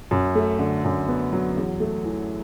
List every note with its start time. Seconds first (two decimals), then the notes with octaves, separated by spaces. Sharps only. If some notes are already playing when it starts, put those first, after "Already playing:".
0.11 F#2
0.35 A3
0.59 D3
0.84 F#2
1.08 B3
1.33 F#3
1.57 E2
1.80 A3
2.05 E3